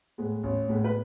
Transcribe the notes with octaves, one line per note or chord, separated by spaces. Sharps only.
A2 G#3 B3
A1
A2 G#3 B3
B4